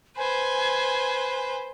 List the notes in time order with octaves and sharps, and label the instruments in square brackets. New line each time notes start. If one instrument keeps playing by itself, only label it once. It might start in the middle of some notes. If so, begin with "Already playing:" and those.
[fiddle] B4 C5 [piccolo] G#5